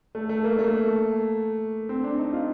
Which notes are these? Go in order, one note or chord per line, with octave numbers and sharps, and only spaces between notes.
A3
A3
A#3
A3
C4
D4
D#4
F4